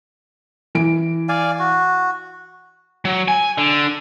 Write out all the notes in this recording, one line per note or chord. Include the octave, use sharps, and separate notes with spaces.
E3 D7
D5 F5 G#5
F#4
F#3
G#5
D3